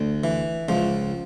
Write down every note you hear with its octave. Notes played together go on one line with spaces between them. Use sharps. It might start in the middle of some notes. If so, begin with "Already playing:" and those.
Already playing: D2
E3
C#2 F3